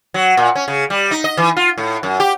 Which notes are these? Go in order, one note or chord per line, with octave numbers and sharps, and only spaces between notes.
F#3
A#2
C#4
C#3
G3
D#4
D#5
E3
F4
A2
F#2
G4